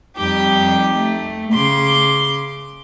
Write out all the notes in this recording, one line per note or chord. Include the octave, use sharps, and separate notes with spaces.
F2 G3 D#4 G4 G5
A3
C#3 C6 D6